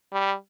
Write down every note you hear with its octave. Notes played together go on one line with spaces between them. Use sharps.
G3